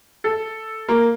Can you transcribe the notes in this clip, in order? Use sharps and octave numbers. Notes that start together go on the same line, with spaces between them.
A4
A#3